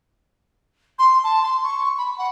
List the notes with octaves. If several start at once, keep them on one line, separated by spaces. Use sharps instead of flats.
C6
A5
C6
C#6
B5
F#5